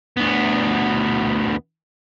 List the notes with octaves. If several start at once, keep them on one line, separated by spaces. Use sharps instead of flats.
D2 B3